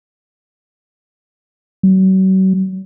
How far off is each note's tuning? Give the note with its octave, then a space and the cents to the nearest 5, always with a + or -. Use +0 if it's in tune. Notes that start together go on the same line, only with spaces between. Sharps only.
F#3 +40